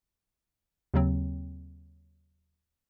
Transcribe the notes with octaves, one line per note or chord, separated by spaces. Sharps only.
D#2 C#3 F#3 C4